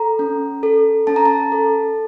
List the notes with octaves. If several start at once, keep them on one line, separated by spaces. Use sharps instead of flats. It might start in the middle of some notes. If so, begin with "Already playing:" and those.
Already playing: A4 A#5
C#4
A4
C#4 A5
A#5
A5
A4